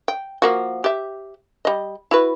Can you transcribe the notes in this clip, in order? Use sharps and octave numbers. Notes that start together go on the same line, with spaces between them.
G5
F3 A#3 F#4
G4 E5
G3 D#5
E4 F#4 B4